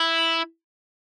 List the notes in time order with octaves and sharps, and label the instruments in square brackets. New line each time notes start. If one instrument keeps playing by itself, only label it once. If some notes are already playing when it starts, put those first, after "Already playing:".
Already playing: [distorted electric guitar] E4